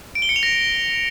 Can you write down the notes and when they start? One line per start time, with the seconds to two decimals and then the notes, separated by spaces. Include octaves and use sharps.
0.15 D7
0.22 G7
0.29 C#7
0.36 F7
0.43 A#6